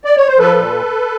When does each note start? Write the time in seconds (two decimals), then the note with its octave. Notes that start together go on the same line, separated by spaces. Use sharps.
0.05 D5
0.17 C#5
0.27 C5
0.38 F3 A4 B4
0.57 A#2